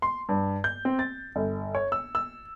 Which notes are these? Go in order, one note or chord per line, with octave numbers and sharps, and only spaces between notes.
C6
G2
G6
C4
A6
G1
C#5
E6
E6